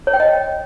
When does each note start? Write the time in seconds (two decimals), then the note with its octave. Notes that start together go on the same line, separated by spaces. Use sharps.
0.07 C#5
0.13 G5
0.20 D#5